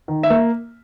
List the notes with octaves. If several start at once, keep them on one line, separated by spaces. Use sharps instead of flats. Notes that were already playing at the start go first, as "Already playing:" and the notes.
D#3
E5
A#3